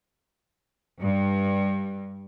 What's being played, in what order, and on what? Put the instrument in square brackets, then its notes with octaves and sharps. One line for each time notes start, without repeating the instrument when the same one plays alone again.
[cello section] G2